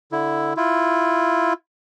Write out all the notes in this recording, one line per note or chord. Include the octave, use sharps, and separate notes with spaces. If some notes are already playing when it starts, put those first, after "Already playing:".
D3 E4
E4 F4